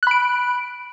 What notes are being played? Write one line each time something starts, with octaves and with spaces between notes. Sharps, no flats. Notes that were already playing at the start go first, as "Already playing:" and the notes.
B5 F#6 D7